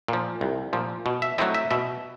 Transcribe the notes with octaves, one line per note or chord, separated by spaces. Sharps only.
A#2 F3
C2
A#2 F3
B2
E5
F#3 A3 C4 E4 D#5
E5
B2 E5